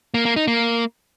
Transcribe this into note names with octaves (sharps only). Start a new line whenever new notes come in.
A#3
A#3
D#4
A#3